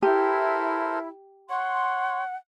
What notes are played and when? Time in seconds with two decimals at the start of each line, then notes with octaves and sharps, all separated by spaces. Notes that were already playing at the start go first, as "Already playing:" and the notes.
0.03 E4 G4 A4 A#4 C5
1.50 C#5 F#5 C6